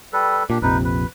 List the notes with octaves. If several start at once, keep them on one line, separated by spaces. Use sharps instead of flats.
G3 A4 B4
A#2 D4 G4
A#1 F2 C3 D#4 B4
B4